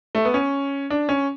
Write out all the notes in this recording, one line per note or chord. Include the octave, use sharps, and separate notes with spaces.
A3
B3
C#4
D4
C#4